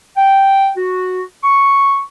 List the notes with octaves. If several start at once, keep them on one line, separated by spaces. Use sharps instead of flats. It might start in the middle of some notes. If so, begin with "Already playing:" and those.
G5
F#4
C#6